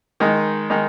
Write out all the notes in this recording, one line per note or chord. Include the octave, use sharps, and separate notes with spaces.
D#3 G#3 D#4
D#3 G#3 D#4